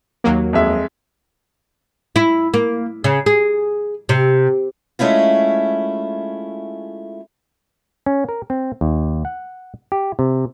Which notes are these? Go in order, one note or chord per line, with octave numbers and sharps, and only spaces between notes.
D#2 F#3 A#3
F2 G#3 E5
E4
A#3
C#3
G#4
C3
G#3 A3 C#4 E4 F4
C#4
A#4
C4
D#2
F#5
G4
C3